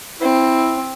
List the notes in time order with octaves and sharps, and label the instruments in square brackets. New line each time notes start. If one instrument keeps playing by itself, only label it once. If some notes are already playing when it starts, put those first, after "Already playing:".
[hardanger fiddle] C4 [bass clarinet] E4